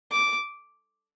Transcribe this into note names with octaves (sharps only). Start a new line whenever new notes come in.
D6